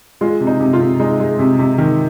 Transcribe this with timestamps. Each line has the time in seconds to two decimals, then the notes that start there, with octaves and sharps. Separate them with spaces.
0.21 G#3 F4
0.40 C3
0.47 D#4
0.60 C3
0.73 F4
0.80 C3
0.99 G#3 D#4
1.20 G#3
1.39 C3
1.59 C3
1.78 D#3